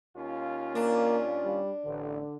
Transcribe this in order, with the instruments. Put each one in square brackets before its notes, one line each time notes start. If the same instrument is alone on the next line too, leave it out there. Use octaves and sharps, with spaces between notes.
[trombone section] D#2 C#4 F4
[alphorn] A#3 [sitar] D4
[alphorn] G3
[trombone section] A1 [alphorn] D3